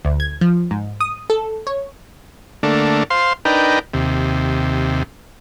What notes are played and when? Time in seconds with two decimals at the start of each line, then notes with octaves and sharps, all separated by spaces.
0.05 D2
0.20 G#6
0.41 F3
0.71 G#2
1.01 D#6
1.30 A4
1.67 C#5
2.63 D3 A3 A#3 D4
3.10 C5 F5 C6
3.45 D4 D#4 A#4 B4 G5
3.93 D#2 C3